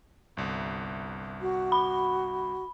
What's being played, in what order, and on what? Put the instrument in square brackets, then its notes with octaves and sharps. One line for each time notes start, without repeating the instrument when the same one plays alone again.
[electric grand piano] G1 C2
[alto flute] F#4
[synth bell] B5